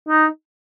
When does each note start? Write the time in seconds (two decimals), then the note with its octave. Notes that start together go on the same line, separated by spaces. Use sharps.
0.09 D#4